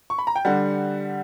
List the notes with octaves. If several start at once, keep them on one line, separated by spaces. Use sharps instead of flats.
C#6
B5
A#5
G5
D3 G3 F#5